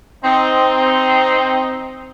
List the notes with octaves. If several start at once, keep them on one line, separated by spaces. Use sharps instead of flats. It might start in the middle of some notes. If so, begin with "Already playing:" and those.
C4 D#4